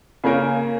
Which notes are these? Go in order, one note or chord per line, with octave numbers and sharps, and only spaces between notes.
C#3 A#3 C#4 A#4